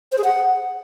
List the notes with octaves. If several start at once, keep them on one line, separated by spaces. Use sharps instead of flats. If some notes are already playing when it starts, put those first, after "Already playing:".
C5
G#4
F#5